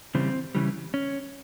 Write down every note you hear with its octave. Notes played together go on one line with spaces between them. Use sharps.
C#3 E3 G3 C4
C#3 E3 G3
C#4